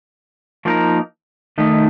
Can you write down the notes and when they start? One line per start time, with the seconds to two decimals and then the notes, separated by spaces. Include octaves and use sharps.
0.65 F3 A#3 D#4 A#4
1.58 D#3 A3 D#4